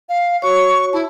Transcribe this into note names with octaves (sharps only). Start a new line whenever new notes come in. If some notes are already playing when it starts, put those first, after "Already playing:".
F5
F#4 C#5 C#6
E4 A5